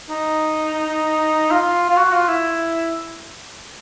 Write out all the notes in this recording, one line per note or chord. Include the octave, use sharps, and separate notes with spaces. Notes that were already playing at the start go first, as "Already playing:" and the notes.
D#4
F4
F4
F#4
F4
E4